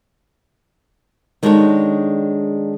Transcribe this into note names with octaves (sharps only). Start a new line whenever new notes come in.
D#3 G#3 D4 F#4 A4 C#5